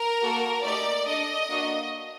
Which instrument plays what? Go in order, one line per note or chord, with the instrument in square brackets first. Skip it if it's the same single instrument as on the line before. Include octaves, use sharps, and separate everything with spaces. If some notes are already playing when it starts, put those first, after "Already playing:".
Already playing: [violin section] A#4
A#3 F#4 A4
A3 D#4 G4 D5
D4 A4 D#5
A#3 D4 F#4